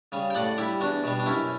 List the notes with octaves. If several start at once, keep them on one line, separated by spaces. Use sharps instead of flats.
C#3 G3
G5
A2 D5 F#5
G3 E4 G4
E2 D4 F#4
B2 G3
D4
F#2 C#4 E4